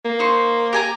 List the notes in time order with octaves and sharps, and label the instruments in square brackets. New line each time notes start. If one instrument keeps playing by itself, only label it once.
[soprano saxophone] A#3
[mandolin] D#4 C5 C#6
G4 G#5 A#5